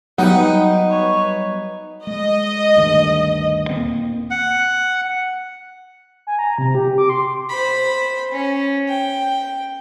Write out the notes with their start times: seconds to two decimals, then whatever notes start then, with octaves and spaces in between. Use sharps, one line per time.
0.18 F#3 G3 B3 D#4 B4 F#5 G5
0.86 B4 C#5
2.07 G#3 D#5
2.76 D2 G2 D#3
3.70 D#1 A#3 C4
4.31 F#5
6.27 G#5
6.39 A#5
6.58 C3
6.75 G4
6.98 D6
7.09 C6
7.49 C5 B5
8.32 C#4
8.89 G5